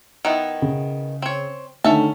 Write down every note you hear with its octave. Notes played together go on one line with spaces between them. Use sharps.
D#3 B3 E4
C#3
C4 C#5
D3 D#3 A3 C#4 E5 A5